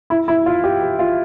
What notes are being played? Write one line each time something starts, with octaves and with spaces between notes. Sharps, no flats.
E4
E4
F4
G4
G4
F4